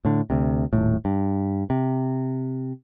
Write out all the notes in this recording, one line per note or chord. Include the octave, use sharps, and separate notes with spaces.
A2 D3
D2 C3
D#1 G#1 A2
G2
C3